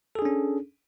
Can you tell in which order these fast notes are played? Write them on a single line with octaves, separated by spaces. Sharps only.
A4 G#4 D4 C#4